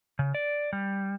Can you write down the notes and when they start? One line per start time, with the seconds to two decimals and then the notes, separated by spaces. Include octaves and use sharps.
0.19 C#3
0.35 D5
0.73 G3